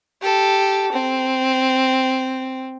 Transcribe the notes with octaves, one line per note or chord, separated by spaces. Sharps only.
G4 A4
C4